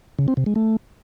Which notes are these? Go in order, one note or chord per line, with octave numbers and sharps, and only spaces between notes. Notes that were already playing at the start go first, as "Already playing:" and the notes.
C#3
C4
C3
G#3
A3